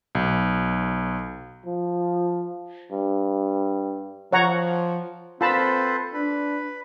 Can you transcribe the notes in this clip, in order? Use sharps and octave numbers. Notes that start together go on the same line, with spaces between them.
B1
F3
G2
F3 C#5 F#5 A#5
C4 F4 A4 B4 C5 A5 B5
D4 B4